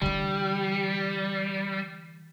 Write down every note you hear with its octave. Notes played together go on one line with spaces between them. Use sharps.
D3 E3 G3